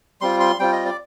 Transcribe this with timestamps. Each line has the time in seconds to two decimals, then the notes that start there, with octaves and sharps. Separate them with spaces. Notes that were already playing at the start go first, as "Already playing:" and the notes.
0.21 G3 C4 F4 C6
0.40 C6
0.59 G3 C4 F4 G5
0.73 D#5
0.85 D5